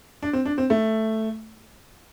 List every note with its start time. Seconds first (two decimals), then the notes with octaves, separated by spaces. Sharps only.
0.23 D4
0.33 C4
0.45 D4
0.58 C4
0.70 A3